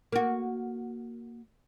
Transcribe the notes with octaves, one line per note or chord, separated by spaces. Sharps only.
A#3 F#4